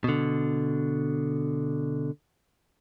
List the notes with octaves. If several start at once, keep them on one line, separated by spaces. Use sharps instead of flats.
B2 D3